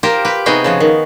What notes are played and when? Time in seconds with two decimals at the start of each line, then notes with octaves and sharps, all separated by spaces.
0.03 F4 G4 A#4 C5
0.25 G4 B4
0.46 C3 B3 D#4 F#4 G#4 G5
0.64 C#3 F3 F#4
0.80 D#3